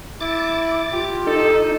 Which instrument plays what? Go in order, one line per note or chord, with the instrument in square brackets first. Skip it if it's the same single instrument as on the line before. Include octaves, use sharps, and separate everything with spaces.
[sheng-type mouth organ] E4 [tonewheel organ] D6 A6
[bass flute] F4 [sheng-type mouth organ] G4
[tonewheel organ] D#4 [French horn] A4